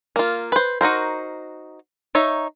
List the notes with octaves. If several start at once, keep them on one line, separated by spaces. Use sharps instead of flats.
A#3 F4
B4 C5
D#4 F#4 A#4 C5
D#4 C#5 E5